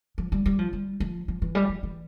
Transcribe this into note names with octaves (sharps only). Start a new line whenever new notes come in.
F3
G3
G3
F3
G3
F3
F3
E3
G3
F3
E3